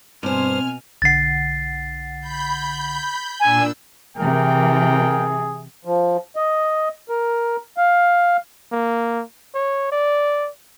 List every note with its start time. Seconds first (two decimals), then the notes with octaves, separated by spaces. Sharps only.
0.23 G2 B2 C4 C5 G#5 F6
1.02 B1 D3 F#5 A6 C7
2.20 B5 G6
3.40 A#2 D4 G#5 E6
4.17 C3 E3 G#4 A#4 G5
5.85 F3
6.36 D#5
7.09 A#4
7.78 F5
8.72 A#3
9.55 C#5
9.92 D5